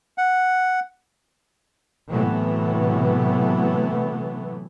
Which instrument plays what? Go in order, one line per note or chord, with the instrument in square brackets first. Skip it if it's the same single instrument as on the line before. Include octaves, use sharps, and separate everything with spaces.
[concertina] F#5
[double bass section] A2 C3 E3 F#3 A3 B3